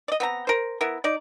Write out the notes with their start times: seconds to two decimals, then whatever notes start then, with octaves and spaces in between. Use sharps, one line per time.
0.08 D5 D#5
0.20 B3 C4 A#5
0.47 A#4 C5
0.81 B3 E4 A#4
1.04 D#4 D5